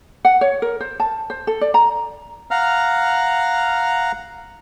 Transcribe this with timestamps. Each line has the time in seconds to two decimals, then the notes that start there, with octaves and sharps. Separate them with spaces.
0.25 F#5
0.41 C#5
0.62 A#4
0.80 C5
1.00 A5
1.30 C5
1.47 A4
1.61 D5
1.74 A#5
2.51 F5 F#5 A#5 F6